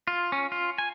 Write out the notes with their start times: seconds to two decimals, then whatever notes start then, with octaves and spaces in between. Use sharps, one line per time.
0.08 F4
0.32 C#4
0.52 F4
0.78 G#5